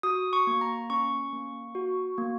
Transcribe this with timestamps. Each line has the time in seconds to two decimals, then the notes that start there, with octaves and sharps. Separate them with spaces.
0.03 F#4 D#6
0.33 C#6
0.47 A#3
0.61 A#5
0.90 C#4 C#6
1.33 A#3
1.75 F#4
2.18 A#3